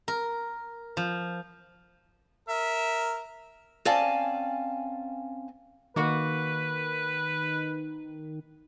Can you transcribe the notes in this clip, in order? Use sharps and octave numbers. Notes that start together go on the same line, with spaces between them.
A#4
F3
A#4 E5
C4 C#4 D5 F5 G#5 A5
D#3 A#3 F#4 B4 F#5